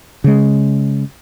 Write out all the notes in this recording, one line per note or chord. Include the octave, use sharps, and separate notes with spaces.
C#3 G#3